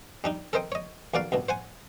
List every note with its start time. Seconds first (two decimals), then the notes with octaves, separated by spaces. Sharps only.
0.24 G3 D4 D#4
0.53 A4 A#4 C5 D#5 G5
0.72 C#5 D#5
1.14 B1 A#3 F#4 D5 F5
1.32 C2 G2 B2
1.49 C5 F#5 G#5